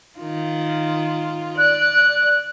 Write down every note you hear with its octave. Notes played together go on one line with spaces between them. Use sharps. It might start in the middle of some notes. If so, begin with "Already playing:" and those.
D#3 F4
D5 F#6